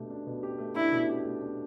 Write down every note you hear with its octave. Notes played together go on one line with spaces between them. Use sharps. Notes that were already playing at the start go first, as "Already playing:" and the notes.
Already playing: B2 A3 D4 G4
D4
B2
G4
A3
D4 E4
B2
G4
A3
D4